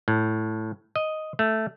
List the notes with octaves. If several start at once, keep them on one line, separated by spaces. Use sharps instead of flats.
A2
D#5
A3